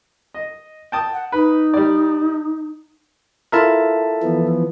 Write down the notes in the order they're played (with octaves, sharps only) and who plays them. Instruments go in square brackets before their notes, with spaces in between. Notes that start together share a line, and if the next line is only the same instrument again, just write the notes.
[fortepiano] D#5
G5 A5 D#6
[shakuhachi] F#5
[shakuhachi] D#4 [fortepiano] B4
[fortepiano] G3 D5
[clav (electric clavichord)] E4 F4 A#4 [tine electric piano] A4 E5 A5
[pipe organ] E3 F3 B3